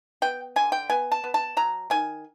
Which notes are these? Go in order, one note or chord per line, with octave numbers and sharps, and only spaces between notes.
B3 G5
D3 G#5
G5
B3 G#5
A5
B3
A5
F#3 A#5
D#3 G#5